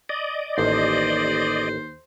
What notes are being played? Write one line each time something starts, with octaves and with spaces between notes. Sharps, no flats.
D5 D#5
A1 D#2 C5